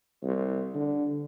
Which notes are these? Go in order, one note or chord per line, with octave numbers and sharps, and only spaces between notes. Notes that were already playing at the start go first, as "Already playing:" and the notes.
C2
D3